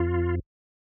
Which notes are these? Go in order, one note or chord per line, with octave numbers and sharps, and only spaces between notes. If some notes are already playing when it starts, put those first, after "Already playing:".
Already playing: F2 F4